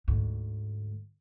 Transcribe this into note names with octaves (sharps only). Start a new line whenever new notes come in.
D2 G#2